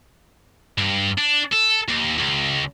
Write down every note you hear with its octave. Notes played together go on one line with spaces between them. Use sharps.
G2
D4
A4
D#2
C#2